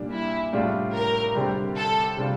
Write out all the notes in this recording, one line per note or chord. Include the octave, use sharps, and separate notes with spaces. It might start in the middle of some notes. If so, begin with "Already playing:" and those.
Already playing: A#2 G3 D4
E4
A2 G3 D4 F4
A#4
D3 G3 C4 G4
A4
C3 G3 D4 F4